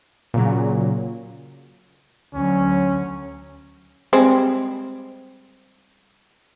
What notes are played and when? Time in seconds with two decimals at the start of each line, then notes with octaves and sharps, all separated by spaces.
0.34 A#2 C#3 F#3
2.35 D2 F#3 C#4
4.13 G3 G#3 C4